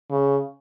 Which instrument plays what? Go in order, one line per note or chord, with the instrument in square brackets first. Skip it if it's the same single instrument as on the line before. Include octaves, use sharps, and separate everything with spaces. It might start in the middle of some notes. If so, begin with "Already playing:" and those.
[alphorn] C#3